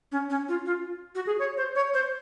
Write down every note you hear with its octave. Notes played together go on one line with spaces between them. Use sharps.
C#4
C#4
F4
F4
F#4
G#4
C#5
C5
C#5
C5